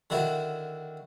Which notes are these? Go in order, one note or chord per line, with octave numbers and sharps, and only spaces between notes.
D3 D#3 E4 F#4